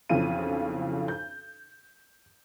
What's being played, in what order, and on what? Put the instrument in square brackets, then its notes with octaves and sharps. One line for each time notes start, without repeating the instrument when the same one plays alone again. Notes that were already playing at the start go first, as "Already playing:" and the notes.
[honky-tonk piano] B1 F2 C#3 E3 F4 D#7
G6